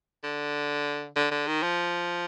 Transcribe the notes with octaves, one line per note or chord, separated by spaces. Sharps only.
D3
D3
D3
D#3
F3